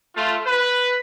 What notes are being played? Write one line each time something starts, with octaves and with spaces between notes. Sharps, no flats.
A3 F4
B4